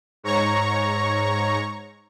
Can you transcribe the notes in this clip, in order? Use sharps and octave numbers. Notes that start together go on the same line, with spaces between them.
G#2 C#5 A#5 C#6